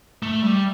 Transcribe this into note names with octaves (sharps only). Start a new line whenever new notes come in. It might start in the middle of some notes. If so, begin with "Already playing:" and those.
A3
G3